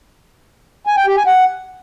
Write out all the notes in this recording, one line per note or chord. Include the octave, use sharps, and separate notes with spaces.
G#5
G5
G4
G#5
F#5